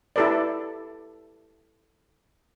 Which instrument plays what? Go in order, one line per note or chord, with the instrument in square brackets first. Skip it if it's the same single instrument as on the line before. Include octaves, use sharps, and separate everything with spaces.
[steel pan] E4 G4 A4 B4 D5